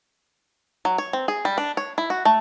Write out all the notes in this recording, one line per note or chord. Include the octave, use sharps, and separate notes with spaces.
F#3
C#5
C4
G#4
G3
D4
C#5
E4
F#4
A3